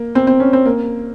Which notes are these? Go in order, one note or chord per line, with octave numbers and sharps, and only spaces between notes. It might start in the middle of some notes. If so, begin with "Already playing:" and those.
Already playing: A#3
C4
C4
C#4
C4
A#3